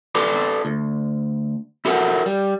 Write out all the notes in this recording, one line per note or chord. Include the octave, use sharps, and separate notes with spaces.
F4 A4 B4 D5
D2
E4 F#4 A4 A#4 F#5
G3